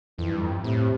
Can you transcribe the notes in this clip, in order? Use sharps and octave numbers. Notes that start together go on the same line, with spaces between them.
F2 E3
G2
F2
A2 C3